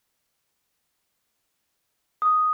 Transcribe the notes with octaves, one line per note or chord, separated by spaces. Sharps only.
D#6